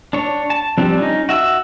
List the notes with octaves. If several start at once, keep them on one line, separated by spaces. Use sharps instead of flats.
D4 C#5
A5
F3 G3 C4 D4
C#4 D#4
F#4 E5 G#5 E6